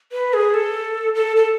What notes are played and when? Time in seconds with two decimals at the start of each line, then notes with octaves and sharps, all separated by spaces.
0.12 B4
0.33 G#4
0.54 A4
1.15 A4
1.36 A4